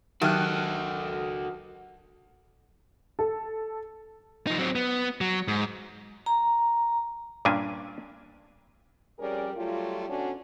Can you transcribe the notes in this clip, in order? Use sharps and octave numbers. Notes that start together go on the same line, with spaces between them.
D#3 F#3 F#4 G4 A4 F6 F#6
A4
F3 D#4
F#3 C4
B3
F#3
G#2
A#5
G2 A#2 A#3 C#4 D4 G#5
F2 G3 C#4 G#4 A#4 D5
F#3 G3 A3 F4
B2 D3 C#4 D4 F#4